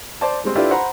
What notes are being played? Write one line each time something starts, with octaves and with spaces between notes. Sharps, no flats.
C5 D5 A5
G3 G#3 C4
D4 E4 F4 G4 A4 B4
C5 F#5 A#5 B5